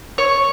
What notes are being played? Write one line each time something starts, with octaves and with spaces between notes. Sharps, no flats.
C#5